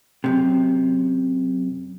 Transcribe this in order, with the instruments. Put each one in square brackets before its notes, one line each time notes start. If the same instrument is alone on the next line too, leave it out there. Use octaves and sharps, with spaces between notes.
[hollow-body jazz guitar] F#2 A2 C3